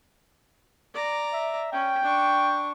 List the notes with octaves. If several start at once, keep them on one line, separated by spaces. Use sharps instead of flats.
D5 A#5
E5
C#4 G5
D4 C#6